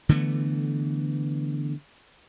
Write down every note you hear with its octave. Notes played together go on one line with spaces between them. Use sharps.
D3 E3 A3 B3